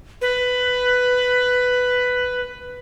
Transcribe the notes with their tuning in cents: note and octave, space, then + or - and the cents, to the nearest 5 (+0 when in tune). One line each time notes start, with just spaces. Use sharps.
B4 +10